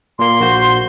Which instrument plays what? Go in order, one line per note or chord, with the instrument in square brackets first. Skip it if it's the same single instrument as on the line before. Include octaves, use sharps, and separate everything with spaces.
[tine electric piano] A#2 A#3 [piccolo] C6
[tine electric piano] A#1 F#4 C5